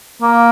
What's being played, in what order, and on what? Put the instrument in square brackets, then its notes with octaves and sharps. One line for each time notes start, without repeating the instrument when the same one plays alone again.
[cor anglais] A#3